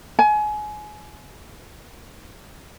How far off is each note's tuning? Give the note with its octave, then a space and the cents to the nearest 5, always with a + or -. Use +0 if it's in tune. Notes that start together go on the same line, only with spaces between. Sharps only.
G#5 +25